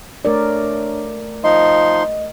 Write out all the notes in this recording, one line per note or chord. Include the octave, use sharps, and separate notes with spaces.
A3 D4 A#4 C#5 D5
F3 D#4 D#5 C6